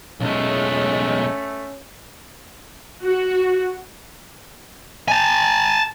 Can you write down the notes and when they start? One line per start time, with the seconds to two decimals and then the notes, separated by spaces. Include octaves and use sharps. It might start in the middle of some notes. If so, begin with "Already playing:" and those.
0.20 B1 G#3 A3 C#4
3.04 F#4
5.08 G#5 A5